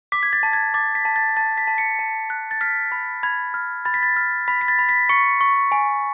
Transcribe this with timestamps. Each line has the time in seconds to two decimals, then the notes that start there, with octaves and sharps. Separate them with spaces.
0.12 D6 B6
0.23 G#6
0.33 A6
0.43 A5
0.53 G#6
0.74 D6 A6
0.95 B6
1.05 A5
1.16 A6
1.37 A5 A6
1.58 B6
1.67 A5
1.78 C#7
1.99 A5
2.30 F#6
2.51 A6
2.61 F6 B6
2.92 B5
3.23 B5 G#6
3.54 F6
3.85 B5 A6
3.94 B6
4.03 A6
4.16 F6
4.48 B5 B6
4.61 B6
4.68 A6
4.79 B5
4.89 B6
5.09 C#6 C#7
5.41 C#6
5.72 G#5